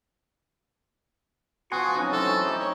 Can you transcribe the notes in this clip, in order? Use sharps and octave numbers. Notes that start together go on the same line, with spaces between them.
F3 B3 F#4 G#5 C6 C#6
F#3 C4 C#4 D#4
E3 A3 A4 C5
D#4 G4 D5
C#5